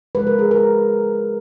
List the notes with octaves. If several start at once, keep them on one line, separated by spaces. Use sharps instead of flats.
C#3 F3 G#3 B4
A#4
G#4
A#4